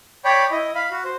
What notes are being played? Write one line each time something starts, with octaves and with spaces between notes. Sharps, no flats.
C#5 D5 G5 B5
E4 D#5
F5 B5
F#4
C5